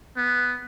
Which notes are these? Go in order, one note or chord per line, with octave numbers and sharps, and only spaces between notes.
B3